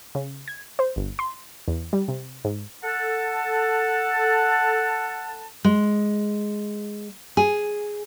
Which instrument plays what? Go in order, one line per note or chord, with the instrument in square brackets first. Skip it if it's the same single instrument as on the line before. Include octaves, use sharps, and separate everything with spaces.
[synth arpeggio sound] C#3
G#6
C5
G1
C6
E2
G3
C3
G#2
[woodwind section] A4 F#5 A5
[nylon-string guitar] G#3
G#4